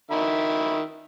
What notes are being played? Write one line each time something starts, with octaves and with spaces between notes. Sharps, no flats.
D#3 E5 B5